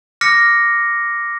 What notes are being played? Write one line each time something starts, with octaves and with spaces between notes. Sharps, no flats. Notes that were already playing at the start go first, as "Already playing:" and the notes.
D6 F6 A#6 C#7